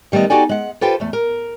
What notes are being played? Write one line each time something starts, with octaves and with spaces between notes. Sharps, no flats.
D#3 G3 A3 B3 D#5
D#4 F#4 G4 A4 D5 G#5
G#3 F#5
F4 G4 A4 B4 C5 G5
E2 A3
A#4